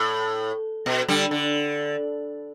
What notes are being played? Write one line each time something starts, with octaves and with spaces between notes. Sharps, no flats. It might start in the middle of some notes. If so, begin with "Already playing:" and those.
Already playing: A2
B2
D3 G3
D3